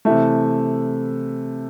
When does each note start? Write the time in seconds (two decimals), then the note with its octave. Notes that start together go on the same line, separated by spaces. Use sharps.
0.05 C3 E3 A3 E5